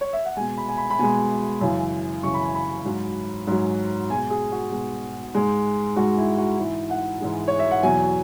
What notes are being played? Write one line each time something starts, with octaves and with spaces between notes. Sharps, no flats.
C#5
E5
F#5
B2 G#3 G#5
B5
G#5
B5
B5
B2 G#3 G#5
F#2 C#3 E3
F#2 C#3 E3 C#6
B5
G#5
B5
G#2 F#3
G#2 F#3
B2 G#3 G#5
G#4
F#4
B2 G#3
G#2 G#3
G#2 G#3 F#4
E4
F#4
G#2 E3 G#3 E4
F#5
G#2 E3 G#3
C#5
E5
F#5
E2 B2 F#3 G#5